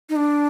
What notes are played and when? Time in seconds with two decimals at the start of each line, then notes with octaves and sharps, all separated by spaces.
0.09 D#4
0.16 D4